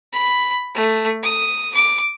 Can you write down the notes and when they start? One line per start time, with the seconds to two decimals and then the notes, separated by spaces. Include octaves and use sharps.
0.13 B5
0.75 A3
1.23 D#6
1.74 D6